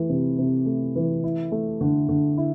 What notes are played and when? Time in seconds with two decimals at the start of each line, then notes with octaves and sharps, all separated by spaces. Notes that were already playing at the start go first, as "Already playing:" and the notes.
Already playing: E3 A3
0.09 C3
0.39 C3
0.66 A3
0.96 E3
1.24 E4
1.52 A3
1.81 D3
2.09 D3
2.38 E4